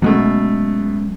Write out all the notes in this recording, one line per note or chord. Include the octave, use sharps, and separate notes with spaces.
B2 F#3 G#3 A3 C#4